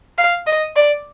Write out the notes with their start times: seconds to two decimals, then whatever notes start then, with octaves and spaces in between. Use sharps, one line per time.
0.18 F5
0.47 D#5
0.76 D5